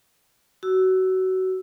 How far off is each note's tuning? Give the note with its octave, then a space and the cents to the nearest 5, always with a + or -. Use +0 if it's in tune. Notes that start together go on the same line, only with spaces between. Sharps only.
F#4 +20 E6 +0